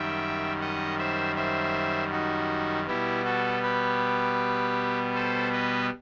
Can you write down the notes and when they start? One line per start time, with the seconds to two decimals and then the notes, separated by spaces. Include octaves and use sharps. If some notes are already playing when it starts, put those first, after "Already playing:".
Already playing: F#2 D#3 G3 E5 G5
0.61 D#5 F#5
0.99 C5 E5
1.36 C5 E5
2.11 D#4 F#4
2.87 B2 G3 B3 E4 G4
3.25 F#4 A4
3.63 G4 B4
5.15 A4 C5
5.52 B4 D#5